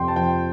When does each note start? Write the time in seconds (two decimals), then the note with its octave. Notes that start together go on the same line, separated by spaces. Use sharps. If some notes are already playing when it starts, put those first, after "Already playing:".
Already playing: F2 C3 G5 C6
0.08 A5
0.16 F3 G5